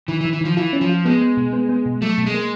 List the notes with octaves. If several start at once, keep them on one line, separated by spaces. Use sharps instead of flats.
D#3 E3
E3
D#3
E3
D#3 F3
E3 F4
C#4
F3
F4
G#3 B3
B3
B2
B3
B3
B2
F#3 A3
B2
G#3
A#3